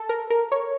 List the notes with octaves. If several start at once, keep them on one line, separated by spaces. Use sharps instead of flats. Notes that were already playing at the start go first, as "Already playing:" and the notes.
Already playing: A4
A#4
A#4
C#5